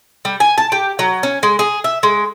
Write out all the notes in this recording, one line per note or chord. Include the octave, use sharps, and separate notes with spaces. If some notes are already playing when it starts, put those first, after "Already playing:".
G3
G#5
A5
G4
F#3
C#4
G#3
G#4
E5
G#3